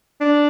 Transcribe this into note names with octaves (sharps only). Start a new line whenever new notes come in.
D4